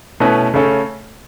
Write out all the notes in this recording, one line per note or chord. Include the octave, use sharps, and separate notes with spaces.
B2 A3 C#4 E4 B4
C#3 A3 C#4 A4